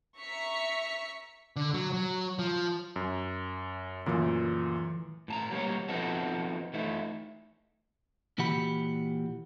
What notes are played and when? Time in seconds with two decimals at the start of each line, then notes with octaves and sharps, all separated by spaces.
0.18 E5 A#5 C#6 B6 C#7
1.56 D3
1.74 F#3
1.93 F#3
2.39 F3
2.96 F#2
4.06 F#2 A#2 E3 A3
5.28 A2 A5 A#5
5.51 F#3 G3 A#3 C#5
5.88 F3 B3 C4 D#4 F#4 A4
6.73 E3 A3 D#4 E4
8.38 A#2 E3 F#4 G4 F#5 B5